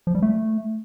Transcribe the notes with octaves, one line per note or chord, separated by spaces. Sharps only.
F3
G3
A3